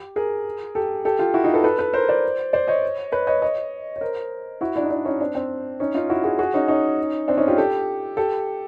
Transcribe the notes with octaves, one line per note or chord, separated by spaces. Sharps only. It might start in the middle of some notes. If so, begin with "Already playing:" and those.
Already playing: G4
G#4 A#4
G4 A4
G4 A4
F4 G4
E4 F#4
D#4 F4
A4 B4
A4 B4
A4 B4
A#4 C5
C5 D5
C5 D5
C#5 D#5
B4 C#5
C#5 D#5
C#5 D#5
C#5
A#4 C5
E4 F#4
D4 E4
D#4
D4 E4
C#4 D#4
C4 D4
C4 D4
C#4 D#4
D#4 F4
E4 F#4
F#4 G#4
F#4 G#4
C#4 D#4
C#4 D#4
C4 D4
C#4 D#4
F4 G4
G4 A4
G4 A4